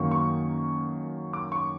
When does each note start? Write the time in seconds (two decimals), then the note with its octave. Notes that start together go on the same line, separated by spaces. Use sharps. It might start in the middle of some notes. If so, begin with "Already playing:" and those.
Already playing: F#2 D#3 F#3 A#3 C#6
0.11 C#6
1.33 D6
1.52 C#6